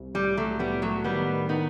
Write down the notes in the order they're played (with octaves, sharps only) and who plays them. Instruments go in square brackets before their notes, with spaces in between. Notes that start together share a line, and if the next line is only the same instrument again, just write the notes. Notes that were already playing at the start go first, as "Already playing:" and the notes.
Already playing: [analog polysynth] C2
[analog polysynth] A2 [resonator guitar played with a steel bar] G3
[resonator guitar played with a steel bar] F#3 A3
[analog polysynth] A2 [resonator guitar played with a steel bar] G3 B3
[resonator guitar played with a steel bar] F#3 A3
[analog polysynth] D#3 [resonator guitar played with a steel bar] G3 B3
[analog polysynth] D#3 [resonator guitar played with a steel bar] B3 D#4